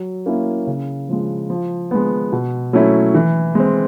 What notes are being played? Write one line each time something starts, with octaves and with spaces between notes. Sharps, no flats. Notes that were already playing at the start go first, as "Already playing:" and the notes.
Already playing: F#3
A#3 C#4 E4
C#3
F3 G#3
F3
G#3 B3
B2
F#3 A3 C#4 E4
E3
G#3 C4